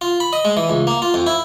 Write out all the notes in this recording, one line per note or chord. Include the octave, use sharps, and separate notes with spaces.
F4
B5
D#5
G#3
E3
C#2
A#3
F4
F2
E4